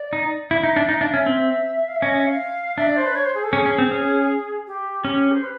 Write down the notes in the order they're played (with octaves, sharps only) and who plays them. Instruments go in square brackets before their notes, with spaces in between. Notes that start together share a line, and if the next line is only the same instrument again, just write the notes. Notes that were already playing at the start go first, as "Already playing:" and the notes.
Already playing: [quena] D5
[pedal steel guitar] D#4
[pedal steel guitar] E4 [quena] E5
[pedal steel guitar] D#4
D4
[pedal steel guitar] D#4 [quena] E5
[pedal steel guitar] D4 [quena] F5
[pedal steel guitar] C#4 [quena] E5
[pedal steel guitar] C4
[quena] F5
E5
[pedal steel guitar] C#4 [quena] D#5
[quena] E5
F5
[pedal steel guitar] D4 [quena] E5
[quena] D5
C5
B4
C#5
C5
G#4
A4
[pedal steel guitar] C#4 [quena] G#4
[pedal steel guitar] C#4
C4
C#4
[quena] G4
[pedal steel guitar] C#4 [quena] G4
[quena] C5
B4